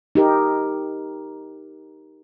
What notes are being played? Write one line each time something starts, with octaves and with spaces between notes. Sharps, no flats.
D#4 G4 A#4